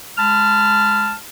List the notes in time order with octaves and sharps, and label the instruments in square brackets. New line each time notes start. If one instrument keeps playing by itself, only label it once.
[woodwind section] G#3 A5 B5 F6